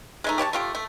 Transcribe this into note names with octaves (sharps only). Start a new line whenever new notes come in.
G#3 A3 D#4
G4 C#5 F#5 A5
A3 F4 G4
A3